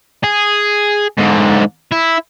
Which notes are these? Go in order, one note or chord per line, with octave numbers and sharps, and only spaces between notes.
G#4
G#2 D3
E4